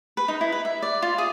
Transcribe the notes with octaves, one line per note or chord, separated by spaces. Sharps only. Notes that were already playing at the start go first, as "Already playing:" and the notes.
B4
D#4
E4
B4
E5
D5
F4
G#4